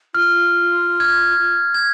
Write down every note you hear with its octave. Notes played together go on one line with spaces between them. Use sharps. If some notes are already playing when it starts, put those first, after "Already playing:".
F4 F6
F6 G#6
G#6